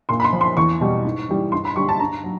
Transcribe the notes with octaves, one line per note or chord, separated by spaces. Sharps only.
A#2 C6
B5
C6
F3
C6
E2 C#6
B2 G3
G#2
E3 G3
G2 C6
B5
D3 G3 C#6
A5
G2 A#5
F#3